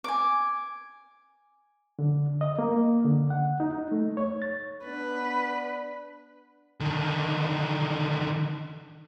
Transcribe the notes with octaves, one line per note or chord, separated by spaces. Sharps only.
G#5 D6
D3
D#5
A#3
D3
F#5
D#4
D#4
A3
C#5
A6
B3 D4 B4
D3 D#3